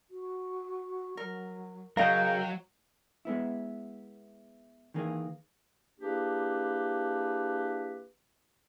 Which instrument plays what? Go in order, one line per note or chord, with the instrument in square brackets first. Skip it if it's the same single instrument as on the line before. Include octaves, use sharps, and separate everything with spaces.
[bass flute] F#4
[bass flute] F#3 [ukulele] A#4
[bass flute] C#3 [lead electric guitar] F#3 [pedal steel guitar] A#4 G5 G6 [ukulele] D#5 F5
[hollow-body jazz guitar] G#3 B3 E4
D#3 E3 A#3 G#4
[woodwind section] A#3 D4 E4 G4 G#4 B4